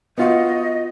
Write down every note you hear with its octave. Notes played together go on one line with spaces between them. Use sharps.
B3 F4 F#4 D#5